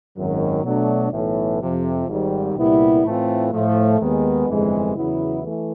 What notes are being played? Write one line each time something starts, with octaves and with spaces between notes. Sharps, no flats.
G#1 F#2 D#3 F#3
B2 F#3 A3 D4
B1 A2 E3 A3
F2 C3 F3
G#1 G#2 D#3 G3
C2 A#2 G3 B3 E4
A2 E3 A3 C4 F4
A2 F3 A3
D#2 D#3 G#3 B3
G1 F2 C3 E3 G#3
E2 C#3 F#3 B3 E4
E3 A3